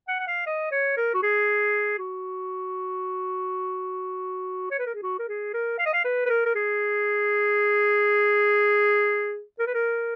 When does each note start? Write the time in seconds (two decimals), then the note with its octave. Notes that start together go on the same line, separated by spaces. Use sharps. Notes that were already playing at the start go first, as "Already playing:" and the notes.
0.08 F#5
0.19 F#5
0.27 F5
0.46 D#5
0.71 C#5
0.97 A#4
1.14 F#4
1.23 G#4
1.99 F#4
4.71 C#5
4.79 B4
4.86 A#4
4.94 G#4
5.02 F#4
5.19 A#4
5.28 G#4
5.54 A#4
5.79 F5
5.86 D#5
5.93 F5
6.04 B4
6.26 B4
6.29 A#4
6.45 A#4
6.55 G#4
9.59 A#4
9.67 B4
9.74 A#4